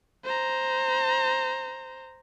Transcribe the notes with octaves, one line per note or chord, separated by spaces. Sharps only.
C5 A#5